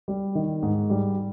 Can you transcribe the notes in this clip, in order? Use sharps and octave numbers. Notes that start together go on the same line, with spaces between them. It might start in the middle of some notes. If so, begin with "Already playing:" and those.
G3
D#3
G#2
G3